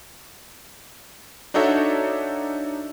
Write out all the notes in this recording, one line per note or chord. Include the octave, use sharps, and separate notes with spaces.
D4 D#4 F#4 A4 C#5 E5